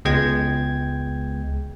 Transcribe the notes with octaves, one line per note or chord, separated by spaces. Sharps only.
C#2 G#3 B3 G5 G#6